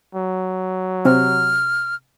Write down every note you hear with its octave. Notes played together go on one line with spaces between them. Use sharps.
F#3
C3 F6